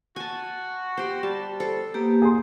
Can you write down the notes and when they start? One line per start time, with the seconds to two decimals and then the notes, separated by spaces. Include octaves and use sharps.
0.16 F#4 G#5 A5
0.97 G4 C5
1.23 G3 A5
1.60 A4 C5
1.94 A#3 B3 G4
2.22 G#4 C6